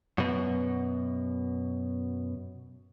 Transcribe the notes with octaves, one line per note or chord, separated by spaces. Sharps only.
F#2 B2